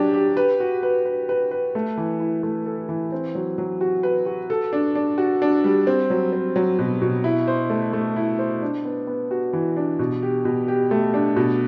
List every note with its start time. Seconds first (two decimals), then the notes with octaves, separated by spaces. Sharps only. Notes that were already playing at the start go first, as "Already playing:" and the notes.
Already playing: F#3 D4 G4
0.14 G4
0.37 B4
0.60 F#4
0.83 B4
1.05 B4
1.29 B4
1.51 B4
1.75 A3
1.97 E3
2.20 E4
2.43 A3
2.66 A4
2.89 E3
3.12 C4
3.35 F#3
3.58 F#3
3.81 F#4
4.03 B4
4.26 F#4
4.50 A4
4.73 D4
4.95 D4
5.18 F#4
5.42 D4
5.64 G3
5.87 C4
6.10 F#3
6.33 C4
6.56 F#3
6.79 B2
7.01 B2
7.24 E4
7.47 C5
7.70 A3
7.93 A3
8.16 E4
8.39 C5
8.62 D4
8.85 B3
9.07 B3
9.31 F#4
9.53 E3
9.77 D4
9.99 B2
10.22 G4
10.45 B2
10.68 G4
10.91 A3
11.14 D4
11.36 B2